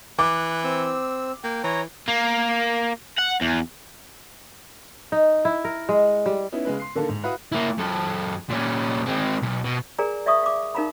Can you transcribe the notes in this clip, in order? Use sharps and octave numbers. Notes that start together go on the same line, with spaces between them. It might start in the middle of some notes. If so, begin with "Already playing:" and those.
E3 D6 F#6
C4 E6
A#3 G5
E3 C#5 A#5
A#3
F#5
E2
D#4
E4
A#4
G#3
G3
B3 C#4 D#4 E4
C#3 G#3 B4
C6 C7
D3 D#3 A#3 D4 A4
G#2
E4 F#4 B4 F5 B5 D#6
A#3 E4
F#2 A4
A#2 C#4
G#3 C4
B1
B2
G#4 A#4 D5 G#5 A#5
D5 E5 F5 C#6 D#6
F5 D6
D#4 A#4 F5 A#5 B5